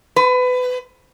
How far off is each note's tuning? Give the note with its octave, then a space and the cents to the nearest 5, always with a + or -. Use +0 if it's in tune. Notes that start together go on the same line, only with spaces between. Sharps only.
B4 +25